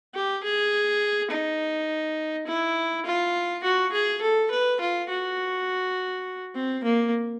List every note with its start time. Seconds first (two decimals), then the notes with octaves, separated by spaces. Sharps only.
0.14 G4
0.44 G#4
1.31 D#4
2.47 E4
3.05 F4
3.63 F#4
3.93 G#4
4.22 A4
4.51 B4
4.80 F4
5.09 F#4
6.55 C4
6.84 A#3